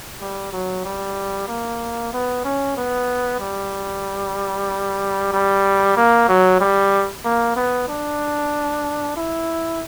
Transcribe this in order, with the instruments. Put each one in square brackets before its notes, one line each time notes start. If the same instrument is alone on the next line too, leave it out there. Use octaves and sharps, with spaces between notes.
[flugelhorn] G3
F#3
G3
A#3
B3
C#4
B3
G3
G3
A#3
F#3
G3
A#3
B3
D4
E4